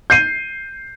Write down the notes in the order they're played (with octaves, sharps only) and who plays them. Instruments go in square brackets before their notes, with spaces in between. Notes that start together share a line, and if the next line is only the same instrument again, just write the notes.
[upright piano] G6 C7 D#7